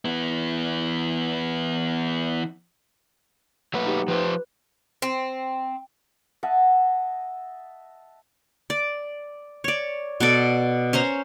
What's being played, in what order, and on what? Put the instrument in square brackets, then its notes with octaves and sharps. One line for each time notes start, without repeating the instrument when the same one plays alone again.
[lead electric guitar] E3 B3
[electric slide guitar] F#3 A3 B4 [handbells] A#3 F#5
[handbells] D#4 G4
[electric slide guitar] F3 G4 C5 [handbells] B4
[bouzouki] C4
[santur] D#5 E5 F#5 A5
[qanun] D5
C#5 D5
B2 A4 D5
C#4 C5 A#5